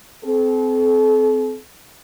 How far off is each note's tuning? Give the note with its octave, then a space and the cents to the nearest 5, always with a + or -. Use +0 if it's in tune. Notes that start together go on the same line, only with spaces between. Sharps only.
C4 -20 A4 -40